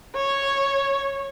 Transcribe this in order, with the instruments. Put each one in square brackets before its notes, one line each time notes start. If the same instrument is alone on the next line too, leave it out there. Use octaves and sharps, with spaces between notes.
[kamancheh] C#5